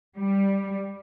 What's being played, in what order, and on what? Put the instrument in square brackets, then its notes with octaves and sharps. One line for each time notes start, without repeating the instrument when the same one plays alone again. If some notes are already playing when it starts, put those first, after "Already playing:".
[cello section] G3